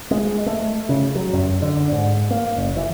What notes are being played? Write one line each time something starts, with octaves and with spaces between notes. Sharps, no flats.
G#3
A3
C#3
F#3
F#2
D3
G#2
A#3
F#1
E3